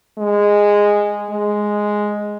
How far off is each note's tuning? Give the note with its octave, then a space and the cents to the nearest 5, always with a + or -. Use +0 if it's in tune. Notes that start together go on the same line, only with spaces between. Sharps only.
G#3 -10
G#3 +0